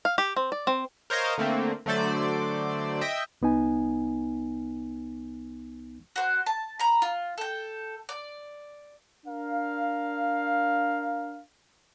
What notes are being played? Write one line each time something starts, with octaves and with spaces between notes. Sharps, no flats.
F5
G4
C4
D5
C4
A#4 C5 C#5 D#5 F5
D3 A3 A#3 C4
D3 F#3 A3 C5 D5
D#5 E5 G5
C2 B3 D#4 G#5
F#4 C5
A5
A#5 B5
F4
A4 G5
D5
D4 A#4 F5